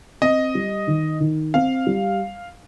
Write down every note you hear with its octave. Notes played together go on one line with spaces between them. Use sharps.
C4 D#5
G3
D#3
D#3
C4 F5
G3